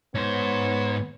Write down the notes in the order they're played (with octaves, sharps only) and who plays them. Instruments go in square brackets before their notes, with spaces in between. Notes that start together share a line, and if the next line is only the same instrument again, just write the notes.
[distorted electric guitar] G#2 C5 [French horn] B3 [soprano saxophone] C#5